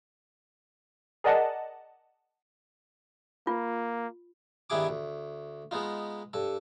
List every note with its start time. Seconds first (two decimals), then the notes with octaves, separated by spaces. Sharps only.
1.24 G#4 A#4 D5 D#5 F#5 A5
3.47 A#3 F4
4.70 G2 D#3 B3 E4 G#4 D6
4.89 D2
5.71 G#3 B3 D#4 F4
6.33 G2 A4